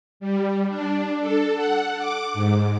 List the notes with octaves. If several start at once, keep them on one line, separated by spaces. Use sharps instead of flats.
G3
D4
A4
F#5
D6
G#2